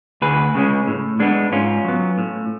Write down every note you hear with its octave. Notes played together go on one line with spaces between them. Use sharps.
D2 G#4 B4
C#3 G#3 C#4
A2
G#3 B3 D4
G#2 C#4 F4
F#3 B3
A2